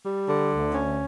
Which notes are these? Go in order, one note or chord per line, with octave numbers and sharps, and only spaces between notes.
G3
D3
D2
C#4